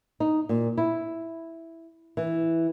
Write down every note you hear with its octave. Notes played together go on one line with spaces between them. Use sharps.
D#4
A#2
E4
E3